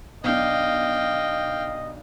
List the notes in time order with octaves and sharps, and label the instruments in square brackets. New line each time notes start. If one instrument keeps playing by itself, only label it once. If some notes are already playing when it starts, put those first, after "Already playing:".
[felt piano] B1 D4 [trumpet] D#5 [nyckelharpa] F5 G5